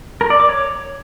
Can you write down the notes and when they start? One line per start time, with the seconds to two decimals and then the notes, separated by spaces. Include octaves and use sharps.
0.21 A#4
0.30 D5
0.40 D6
0.49 C#5